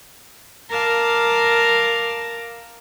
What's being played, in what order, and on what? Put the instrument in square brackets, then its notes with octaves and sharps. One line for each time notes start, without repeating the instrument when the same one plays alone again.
[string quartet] A#4 F5 A5 D6